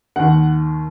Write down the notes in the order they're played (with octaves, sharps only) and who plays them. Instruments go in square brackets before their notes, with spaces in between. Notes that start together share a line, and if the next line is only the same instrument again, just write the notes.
[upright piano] D#2 D#3 F#5